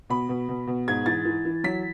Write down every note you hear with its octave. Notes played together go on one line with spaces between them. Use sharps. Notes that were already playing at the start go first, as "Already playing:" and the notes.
B2 B5
B2
B2
B2
G#2 G#6
E3 A6
E3
E3
F#3 B6